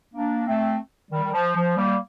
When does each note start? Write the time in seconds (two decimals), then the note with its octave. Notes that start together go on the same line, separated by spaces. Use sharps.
0.14 A#3 D4
0.46 A3 C4
1.11 D#3 G3
1.23 D#3
1.33 F3
1.56 F3
1.76 G3 A#3